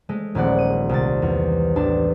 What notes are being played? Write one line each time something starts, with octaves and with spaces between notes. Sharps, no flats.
G#3 A3
D#1 A#1 D5 F#5
D#7
C2 A6
E2
A1 D4 A5